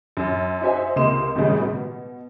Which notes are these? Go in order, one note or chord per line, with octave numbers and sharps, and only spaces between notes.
F#2
D#4 F#4 C5 E5 G#5
C#2 C3 A#3 D#5 C6 E7
G#1 A2 C#3 G3 G#3
B2